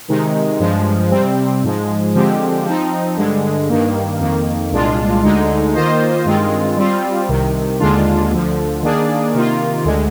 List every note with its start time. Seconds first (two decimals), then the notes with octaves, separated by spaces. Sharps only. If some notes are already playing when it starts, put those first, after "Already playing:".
0.08 C3 D#3 G#3 D#4
0.60 G2 F3 G#3
1.11 C3 G3 C4
1.63 G#2 F3 G#3
2.14 D3 F3 G#3 C4 G4
2.65 F3 C4 D#4
3.17 G2 D3 G#3
3.69 G2 D#3 A#3
4.19 F2 D#3 A#3
4.72 C2 A#2 G#3 D4 F4
5.23 D2 D3 G#3 D#4
5.74 D#3 A#3 F4 C5 D#5
6.25 G2 D#3 G#3 C4 F4
6.77 G3 C4 F4
7.28 C2 C3 D#3
7.79 D#2 D3 G#3 D4 F4
8.31 D2 D3 F3
8.82 D#3 A#3 D4 G#4 D5
9.34 C3 D#3 A#3 F4
9.84 D2 D3 G#3